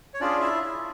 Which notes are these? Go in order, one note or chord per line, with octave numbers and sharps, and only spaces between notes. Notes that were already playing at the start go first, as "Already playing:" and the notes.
C#5
C#4 D4 F4 G#4 D5
E4 E5